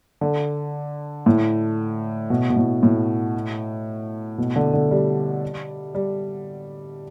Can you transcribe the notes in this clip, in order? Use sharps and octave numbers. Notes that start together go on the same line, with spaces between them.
D3
A2
B2
B2
A2
A2
B2
D3
D3
G3
G3